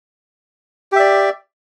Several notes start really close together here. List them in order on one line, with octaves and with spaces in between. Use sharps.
G4 E5 D5